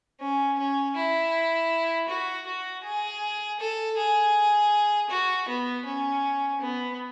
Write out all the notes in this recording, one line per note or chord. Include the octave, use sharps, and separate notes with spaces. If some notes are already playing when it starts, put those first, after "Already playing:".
C#4
C#4
E4
F#4
F#4
G#4
A4
G#4
F#4
B3
C#4
B3